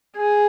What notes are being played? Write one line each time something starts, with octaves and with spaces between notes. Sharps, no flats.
G#4